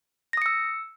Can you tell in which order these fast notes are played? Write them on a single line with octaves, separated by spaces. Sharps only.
A#6 D#6 C#7 E6